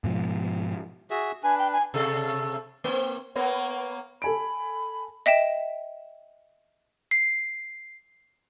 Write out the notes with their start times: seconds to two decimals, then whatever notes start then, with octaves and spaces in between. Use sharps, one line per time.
0.04 G#2 B2 F3
1.10 F#4 G#4 E5
1.43 D4 B4 G#5
1.59 G5
1.72 G#5
1.94 C3 A4
2.84 A#3 C4
3.36 A#3 B3 C#5
4.22 A4 G#5 B5 D7
5.26 D#5 E5 G5 E7
7.11 C7